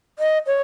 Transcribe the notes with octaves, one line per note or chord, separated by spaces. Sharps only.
D#5
C#5